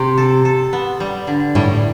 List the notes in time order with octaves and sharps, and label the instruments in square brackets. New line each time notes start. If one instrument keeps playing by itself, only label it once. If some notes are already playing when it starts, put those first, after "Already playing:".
Already playing: [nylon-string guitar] C3 [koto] G4
[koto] A4
A4
B3
G3
D3
[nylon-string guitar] A2 [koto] G3